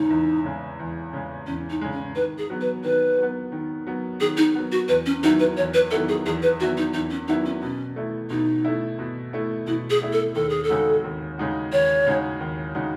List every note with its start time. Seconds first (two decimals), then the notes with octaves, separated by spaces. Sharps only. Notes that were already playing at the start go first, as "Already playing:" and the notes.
Already playing: E2 C#3 G#3 D#4
0.10 E2
0.45 C#3 G#3
0.79 E2
1.13 C#3 G#3
1.47 E2 C#4
1.70 D#4
1.81 C#3 G#3
1.93 C#4
2.16 D#3 B4
2.38 G#4
2.50 F#3 B3
2.61 B4
2.84 D#3 B4
3.18 F#3 B3
3.52 D#3
3.86 F#3 B3
4.20 D#3 G#4
4.37 D#4
4.55 F#3 B3
4.72 F#4
4.88 E2 B4
5.06 C#4
5.23 D#3 F#3 B3 D#4 E4
5.40 B4
5.57 E2 C#5
5.74 B4
5.91 D#3 F#3 B3 E4 A4
6.09 G#4
6.26 E2 G#4
6.42 B4
6.60 D#3 F#3 B3 E4 F#4
6.77 D#4
6.94 E2 D#4
7.11 C#4
7.28 D#3 F#3 B3 D#4 E4
7.45 C#4
7.62 B2 C#4
7.96 A3 E4
8.30 B2 D#4
8.65 A3 E4
8.99 B2
9.33 A3 E4
9.67 B2 E4
9.90 G#4
10.01 A3 E4
10.13 A4
10.35 D#2 A4
10.49 G#4
10.64 A4
10.69 C#3 G#3 D#4 F#4
11.04 D#2
11.38 C#3 G#3 D#4 F#4
11.72 D#2 C#5
12.06 C#3 G#3 D#4 F#4
12.40 D#2
12.75 C#3 G#3 D#4 F#4